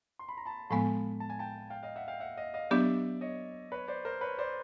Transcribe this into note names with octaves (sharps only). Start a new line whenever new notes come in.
C6
B5
A#5
A5 B5
A2 F3 G#3 B3 A5 B5
A5
G#5
G5 A5
F5 G5
D#5 F5
E5 F#5
F5 G5
E5 F#5
D#5 F5
D#5 F5
F#3 B3 D4 G4 D5 E5
C#5 D#5
B4 C#5
C5 D5
A#4 C5
B4 C#5
C5 D5